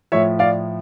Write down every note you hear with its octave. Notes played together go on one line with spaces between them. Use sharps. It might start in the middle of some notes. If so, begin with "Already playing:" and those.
A2 F3 C#5 E5
D5 F5